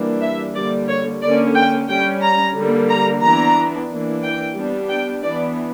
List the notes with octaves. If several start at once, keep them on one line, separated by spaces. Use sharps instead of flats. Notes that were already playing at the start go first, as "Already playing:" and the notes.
Already playing: E3 G3 A#3 D4
E5
D3 G3 A#3 D5
C#5
D3 A#3 C#4 D5
G5
G3 C#4 G5
A#5
D3 G3 A#3
A#5
E3 B3 D4 A#5
E3 A#3 D4
G5
G3 B3 D4
G5
E3 B3 D4 D5